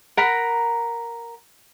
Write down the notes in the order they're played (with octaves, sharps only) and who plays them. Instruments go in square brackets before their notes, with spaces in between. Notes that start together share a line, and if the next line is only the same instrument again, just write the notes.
[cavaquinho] A#4 F#5 A#5 B5